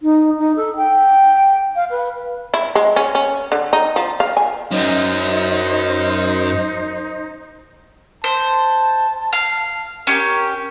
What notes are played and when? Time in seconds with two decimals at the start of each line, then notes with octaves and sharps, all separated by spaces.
0.02 D#4
0.38 D#4
0.56 A4
0.76 G5
1.76 F5
1.90 B4
2.54 E4
2.75 G#3
2.96 C#4
3.15 C#4
3.52 D3
3.73 D#4
3.96 F3
4.20 F5
4.37 G#5
4.71 F#2 D#4 C5 D#5
8.24 C5 A5
9.33 F5
10.07 C#4 G4 A#4